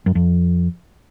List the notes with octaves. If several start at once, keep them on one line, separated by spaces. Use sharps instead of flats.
F#2
F2